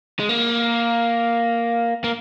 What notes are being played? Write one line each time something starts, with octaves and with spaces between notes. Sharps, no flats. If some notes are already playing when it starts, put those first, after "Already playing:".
G#3
A#3
A#3